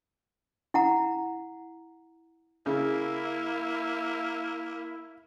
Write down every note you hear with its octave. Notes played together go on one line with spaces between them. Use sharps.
E4 F#5 A#5
C#3 A#3 E4